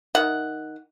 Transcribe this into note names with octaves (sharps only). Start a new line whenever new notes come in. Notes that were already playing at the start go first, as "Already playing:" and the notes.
D#3 F#5